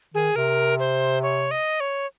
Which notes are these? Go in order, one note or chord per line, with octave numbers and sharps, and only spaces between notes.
D#3 G#4
C3 A#4
C5
C#5
D#5
C#5